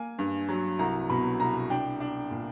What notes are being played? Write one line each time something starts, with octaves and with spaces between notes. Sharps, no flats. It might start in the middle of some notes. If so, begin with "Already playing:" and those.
Already playing: A#3 G#5
G2
F#3
C2 A#5
B2 B5
C2 A#5
D4 G5
D4
A#2